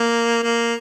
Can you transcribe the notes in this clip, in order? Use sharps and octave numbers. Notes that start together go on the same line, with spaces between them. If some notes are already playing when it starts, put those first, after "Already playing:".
Already playing: A#3
A#3